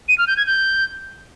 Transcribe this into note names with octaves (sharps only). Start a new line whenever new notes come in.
D#7
F6
G6
G#6
G6